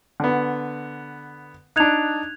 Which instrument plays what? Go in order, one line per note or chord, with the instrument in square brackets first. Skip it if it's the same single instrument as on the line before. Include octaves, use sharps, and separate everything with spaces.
[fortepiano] D3 B3
[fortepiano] D4 D#4 [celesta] F#6 G#6 F7